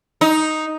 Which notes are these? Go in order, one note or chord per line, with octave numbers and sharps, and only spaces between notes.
D#4